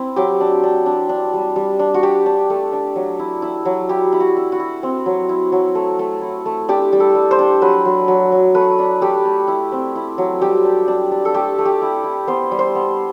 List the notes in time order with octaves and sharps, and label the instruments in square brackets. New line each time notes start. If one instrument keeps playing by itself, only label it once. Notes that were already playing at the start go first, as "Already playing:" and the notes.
Already playing: [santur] C4 E4
F#3 G4
D4
D4
D4
D4
G3
G3
D4
F#4
D4 G4
D4
A3
D4
F#3
E4
E4
F#3
E4 G4
E4
F#4
E4
F#4
E4
C4
F#3
E4
F#3
A3
A3
E4
A3
D4 G4
G3
A4
G3
C5
D4
F#3 B4
F#3
F#3
F#3
A3 B4
D4
A3 G4
A3
E4
C4
E4
F#3
G3 G4
D4
D4
D4
A4
A3 G4
A3
G4
E4
E4
B3 C5
G3
C5
B3